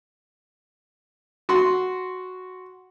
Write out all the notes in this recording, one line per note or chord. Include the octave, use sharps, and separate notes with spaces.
F#4 C6